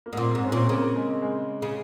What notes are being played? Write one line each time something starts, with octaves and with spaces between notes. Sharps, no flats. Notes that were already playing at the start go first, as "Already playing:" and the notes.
A#3
G#2
A#2 C4
C4
G#2
C#4
A#2 C4
C#3 A#3
G#3
G#3
C#3